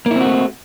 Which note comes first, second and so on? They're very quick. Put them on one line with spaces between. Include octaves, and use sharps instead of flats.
A#3 E4 C4 F#4 A3